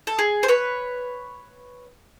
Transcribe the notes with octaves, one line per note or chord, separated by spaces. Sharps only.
A4
G#4
C5
B4 C#5